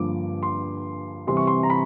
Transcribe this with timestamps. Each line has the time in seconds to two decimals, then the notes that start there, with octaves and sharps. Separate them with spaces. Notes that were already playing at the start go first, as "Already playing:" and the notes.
Already playing: G2 D3 F3 A#3 D6
0.43 C6
1.27 C3 E3 G3 C4 C6
1.37 C#6
1.47 C6
1.63 A#5
1.70 B5